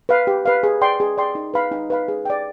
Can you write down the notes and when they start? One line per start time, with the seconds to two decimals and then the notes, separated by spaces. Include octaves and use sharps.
0.09 B4 F5
0.27 G4
0.46 B4 F5
0.63 G#4
0.81 D5 G5 C6
1.00 G#4
1.18 D5 G5 C6
1.35 D#4
1.54 B4 F5 B5
1.72 D#4
1.90 B4 F5 B5
2.08 G#4
2.25 D5 G5